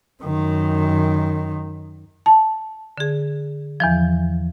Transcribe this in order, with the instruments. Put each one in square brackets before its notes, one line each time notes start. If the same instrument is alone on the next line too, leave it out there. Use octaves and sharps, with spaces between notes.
[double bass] F#2 D#3
[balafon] A5
[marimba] D3 G#4
E2 E3 F3